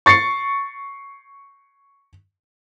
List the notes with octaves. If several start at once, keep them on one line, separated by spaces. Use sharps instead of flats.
C#6 A6 C7 C#7